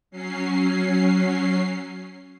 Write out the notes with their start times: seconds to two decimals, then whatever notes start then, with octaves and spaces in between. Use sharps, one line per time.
0.11 F#3 C#4 C7